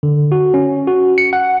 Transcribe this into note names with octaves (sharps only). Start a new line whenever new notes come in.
D3
F#4
C#4
F#4
C#7
F#5